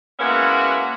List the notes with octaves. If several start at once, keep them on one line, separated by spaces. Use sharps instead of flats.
G#3 A#3 B3 C#4 E4 F#4